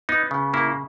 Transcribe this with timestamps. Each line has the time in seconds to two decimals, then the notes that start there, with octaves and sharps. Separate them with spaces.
0.09 B3 D#4
0.31 C#3
0.54 A#3 E4